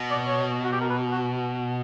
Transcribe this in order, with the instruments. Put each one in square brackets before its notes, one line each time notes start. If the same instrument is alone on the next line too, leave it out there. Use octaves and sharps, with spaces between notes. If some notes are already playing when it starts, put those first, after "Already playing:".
Already playing: [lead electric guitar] B2
[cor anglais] D5
C#5
F#4
G4
A#4
B4
F#4